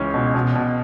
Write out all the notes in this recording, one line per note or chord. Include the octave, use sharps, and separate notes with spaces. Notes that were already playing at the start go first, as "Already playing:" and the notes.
Already playing: C#2 E3 C#4
B2
B2
B2